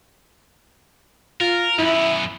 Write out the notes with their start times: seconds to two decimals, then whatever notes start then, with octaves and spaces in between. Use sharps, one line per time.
1.41 F4 A#4
1.79 F#2 B3 E4